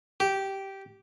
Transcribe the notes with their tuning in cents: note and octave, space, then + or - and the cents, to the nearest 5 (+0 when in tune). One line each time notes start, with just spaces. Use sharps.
G4 -10